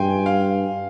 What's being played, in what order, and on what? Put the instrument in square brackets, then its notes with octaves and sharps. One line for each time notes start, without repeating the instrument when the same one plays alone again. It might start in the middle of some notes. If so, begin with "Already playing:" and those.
Already playing: [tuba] G2 [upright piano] G5 G#5 C6
[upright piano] F5